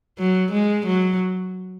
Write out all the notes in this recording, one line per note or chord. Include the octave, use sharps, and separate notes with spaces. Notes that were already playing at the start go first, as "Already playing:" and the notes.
F#3
G#3
F#3